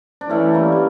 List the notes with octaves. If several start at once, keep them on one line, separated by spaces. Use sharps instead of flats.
D4
E3 A3 C#4
G3 A#3
G3